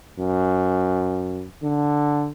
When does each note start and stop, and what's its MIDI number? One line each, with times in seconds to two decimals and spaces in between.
0.19 1.45 42
1.63 2.30 50